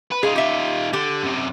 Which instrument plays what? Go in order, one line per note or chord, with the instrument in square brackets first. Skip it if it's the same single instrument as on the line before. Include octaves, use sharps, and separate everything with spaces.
[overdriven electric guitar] B4
[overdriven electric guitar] D#4 F4 [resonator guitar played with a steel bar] G#4
[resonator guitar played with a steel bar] G4 E5
[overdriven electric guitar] D3 [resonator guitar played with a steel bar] G4
[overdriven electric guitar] F#2 C3